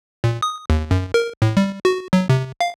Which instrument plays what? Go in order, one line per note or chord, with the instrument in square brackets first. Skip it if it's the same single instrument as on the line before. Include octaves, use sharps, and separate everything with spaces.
[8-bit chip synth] A#2
D#6
D#2
F#2
A#4
A2
G3
F#4
F#3
C3
F5